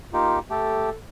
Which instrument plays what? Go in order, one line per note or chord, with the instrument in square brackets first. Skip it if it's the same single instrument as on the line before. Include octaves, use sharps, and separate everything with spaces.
[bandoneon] A#3 D#4 G4 [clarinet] F4
[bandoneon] A3 G4 [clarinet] A4